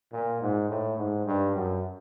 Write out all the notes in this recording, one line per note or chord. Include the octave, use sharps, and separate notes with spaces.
A#2
G#2
A2
G#2
G2
F#2